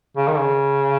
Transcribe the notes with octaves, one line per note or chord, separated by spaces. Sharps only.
C#3
D#3
C#3